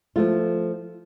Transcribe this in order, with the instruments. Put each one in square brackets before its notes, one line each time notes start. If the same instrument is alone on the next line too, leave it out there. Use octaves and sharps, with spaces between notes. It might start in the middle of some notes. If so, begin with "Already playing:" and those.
[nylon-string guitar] F3 A3 F4